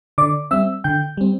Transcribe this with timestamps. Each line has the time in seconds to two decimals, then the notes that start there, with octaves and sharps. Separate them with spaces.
0.18 D3 D5 D6
0.51 G3 C4 E5 E6
0.84 D3 G5 G6
1.17 G3 C4